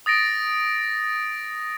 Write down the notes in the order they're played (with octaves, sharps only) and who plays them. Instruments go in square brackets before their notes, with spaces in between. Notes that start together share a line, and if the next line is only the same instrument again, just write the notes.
[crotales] D#6 A6 A#6 D7